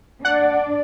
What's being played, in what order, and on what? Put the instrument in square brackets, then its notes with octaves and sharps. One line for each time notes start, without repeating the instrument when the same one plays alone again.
[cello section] D4 D5 [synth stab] F#5